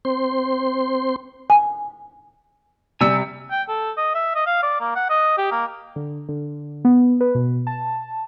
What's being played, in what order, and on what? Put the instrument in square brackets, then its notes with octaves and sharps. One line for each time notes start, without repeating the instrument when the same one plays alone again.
[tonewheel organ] C4 C5 C6
[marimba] G#5
[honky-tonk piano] C3 G3 C#7 [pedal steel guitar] G#5 E6
[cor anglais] G5
A4
D#5
E5
D#5
F5
D5
A#3
F#5
D#5
G4
A#3
[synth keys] D3
D3
B3
B4
B2
A5